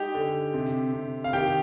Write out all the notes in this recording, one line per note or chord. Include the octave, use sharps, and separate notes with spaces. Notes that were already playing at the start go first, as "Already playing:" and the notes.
Already playing: G#3 D#4 G4 G5
D3
C3
C3
F5
D#3 G4 G5